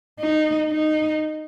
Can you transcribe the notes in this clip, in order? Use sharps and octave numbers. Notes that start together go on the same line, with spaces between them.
D#4
D#4